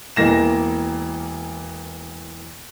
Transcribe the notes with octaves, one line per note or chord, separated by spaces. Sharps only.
E1 E3 A#3 A#6 E7